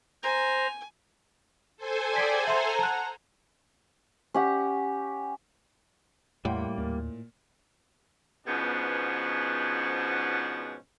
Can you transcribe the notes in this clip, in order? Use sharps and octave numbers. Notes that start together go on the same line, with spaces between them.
C5 G#5 A#5
A4 C5 G#5
G#4 D5 G5 G#6 B6
E5 F#5 A#5 C6
A5 F#6
C#4 G4 F#5
E2 A2 G3 A#3 F#5 G5 C6
D#2 A#2
G#2 B2 F3 B3 C#4 D4